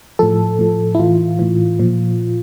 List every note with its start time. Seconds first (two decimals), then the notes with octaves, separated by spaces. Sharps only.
0.19 A2 F3 A4
0.59 A2 F3
0.95 E4
0.99 A2 E3 F4
1.39 A2 E3
1.80 A#2 F3